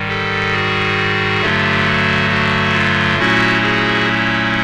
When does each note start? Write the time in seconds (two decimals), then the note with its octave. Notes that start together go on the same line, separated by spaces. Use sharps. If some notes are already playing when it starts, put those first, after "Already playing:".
Already playing: G#2 D#3 G3
0.08 G4 A4
0.52 F#4 G#4
1.41 G2 D3 F#3 A3 F4 G4
1.85 F#4
2.30 F#4
2.73 F4
3.18 A#2 F#3 A3 C#4 E4 F#4
3.62 F#4 G#4